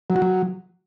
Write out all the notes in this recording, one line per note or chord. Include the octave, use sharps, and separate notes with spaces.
F#3
F#4
F#3